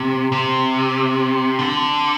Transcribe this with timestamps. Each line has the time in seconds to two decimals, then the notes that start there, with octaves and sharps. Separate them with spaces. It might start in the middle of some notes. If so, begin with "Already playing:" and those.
Already playing: C3
0.32 C3
1.59 D3